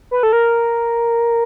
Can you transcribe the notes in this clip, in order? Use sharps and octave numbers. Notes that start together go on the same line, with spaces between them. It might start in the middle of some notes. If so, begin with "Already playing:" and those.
B4
A4
A#4